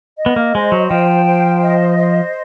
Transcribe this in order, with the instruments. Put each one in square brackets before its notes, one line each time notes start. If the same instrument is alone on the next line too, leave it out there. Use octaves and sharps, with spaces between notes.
[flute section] D#5
[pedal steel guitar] B3
A#3
[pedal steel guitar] G#3 [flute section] C5
[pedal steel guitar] F#3
[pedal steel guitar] F3 [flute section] G5
[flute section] C5
D#5
C5